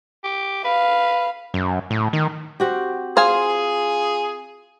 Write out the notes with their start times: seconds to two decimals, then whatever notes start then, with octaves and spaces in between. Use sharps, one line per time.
0.24 G4
0.64 B4 F5
1.54 F#2
1.90 A2
2.13 D#3
2.60 C4 F#4 G4
3.17 F4 G#4 C5 F5 G#5